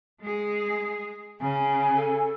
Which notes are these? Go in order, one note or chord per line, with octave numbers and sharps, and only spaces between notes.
G#3 G#4
C#3 G#5
A4